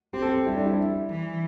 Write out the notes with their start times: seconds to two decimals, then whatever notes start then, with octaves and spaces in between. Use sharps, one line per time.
0.13 C4 G4
0.22 A4
0.29 G4
0.46 G3 E4
0.56 D4
0.66 E4
1.09 E3